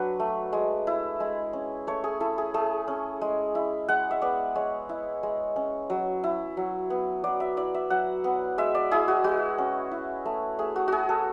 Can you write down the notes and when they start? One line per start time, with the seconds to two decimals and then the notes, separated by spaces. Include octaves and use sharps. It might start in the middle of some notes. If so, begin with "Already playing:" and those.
Already playing: F#3 D4 F#4 B4
0.20 A3
0.53 G#3
0.87 E4
1.20 G#3
1.53 C#4
1.87 A3 C#5
2.04 G#4
2.20 E4 A4
2.38 G#4
2.54 A3 G#4
2.88 C#4
3.21 G#3
3.55 E4
3.88 G#3 F#5
4.11 E5
4.22 B3 D5
4.55 G#3 C#5
4.89 E4
5.23 G#3
5.56 C#4
5.90 F#3
6.24 E4
6.57 F#3
6.90 B3
7.24 F#3 D5
7.40 E5
7.57 E4 D5
7.74 E5
7.90 F#3 F#5
8.24 B3
8.58 G#3 E5
8.75 D5
8.91 E4 G#4
9.08 F#4
9.24 G#3 F#4
9.58 C#4
9.91 E4
10.26 A3
10.59 A3 G#4
10.76 F#4
10.88 E4 F#4 G#4
11.09 A4